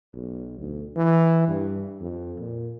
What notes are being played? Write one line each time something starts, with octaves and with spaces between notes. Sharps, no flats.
B1
D2
E3
G2
F2
A#2